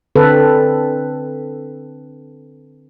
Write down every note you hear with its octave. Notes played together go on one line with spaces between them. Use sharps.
D3 C4 A4 B4